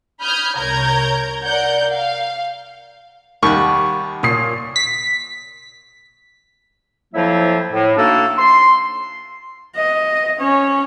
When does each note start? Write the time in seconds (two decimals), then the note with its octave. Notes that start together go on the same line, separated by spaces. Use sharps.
0.20 B5 D#6 F6 G6 G#6
0.57 C2 A#4 C#5 A#5 G6 G#6
1.44 A#4 D5 F#5 G6
1.92 F5
3.43 D#2 D#3 G3 F#5 C#6
4.23 A#2 C#5 D#6 C7
4.76 B6
7.14 F2 F3 F#3 A#3 E4 E5
7.71 A2
7.96 A3 A#3 D4 D#4 F#4 A4
8.37 C6
9.76 D#5
10.39 C#4 C#5